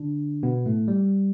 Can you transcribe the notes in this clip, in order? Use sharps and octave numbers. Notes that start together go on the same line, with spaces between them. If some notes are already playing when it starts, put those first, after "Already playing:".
Already playing: D3 D4
B2 B3
A2 A3
G3